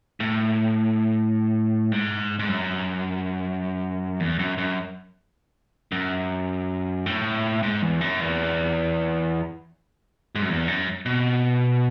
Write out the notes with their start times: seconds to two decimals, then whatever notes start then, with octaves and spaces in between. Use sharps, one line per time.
0.20 A2
1.92 G#2
2.39 G#2
2.49 F#2
4.20 E2
4.39 F#2
4.58 F#2
5.92 F#2
7.06 A2
7.63 G#2
7.82 E2
8.01 F#2
8.21 E2
10.35 G#2
10.42 F#2
10.49 E2
10.68 F#2
11.06 B2